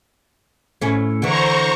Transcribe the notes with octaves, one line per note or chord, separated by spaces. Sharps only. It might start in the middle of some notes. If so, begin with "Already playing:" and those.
A2 C#4
D3 E3 C5 A#5 C#6